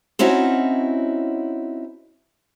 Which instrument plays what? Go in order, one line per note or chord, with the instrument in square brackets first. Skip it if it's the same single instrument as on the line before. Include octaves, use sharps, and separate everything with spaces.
[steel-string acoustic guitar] C4 C#4 D#4 E4 F#4